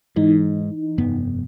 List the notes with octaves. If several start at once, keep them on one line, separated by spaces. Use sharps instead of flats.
G#2 E3 D#4
F1 G2 B3